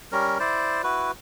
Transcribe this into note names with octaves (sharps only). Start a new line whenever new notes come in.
G3 C#4 A#4
E4 C5 D5
E4 F#4 B4